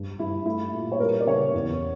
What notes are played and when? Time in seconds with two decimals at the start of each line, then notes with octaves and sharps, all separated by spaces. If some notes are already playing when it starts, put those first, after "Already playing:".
Already playing: G2
0.19 G2 E4
0.46 A3 E4
0.74 A#2
0.92 C#5
1.00 G3 A#4
1.20 D5
1.26 C#3 C#5
1.54 E2